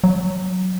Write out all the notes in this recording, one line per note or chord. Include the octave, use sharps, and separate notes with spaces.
F#3